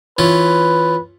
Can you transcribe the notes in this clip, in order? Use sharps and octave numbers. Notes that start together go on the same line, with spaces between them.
E3 C#4 F4 B4